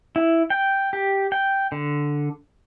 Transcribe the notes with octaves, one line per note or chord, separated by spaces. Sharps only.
E4
G5
G4
G5
D3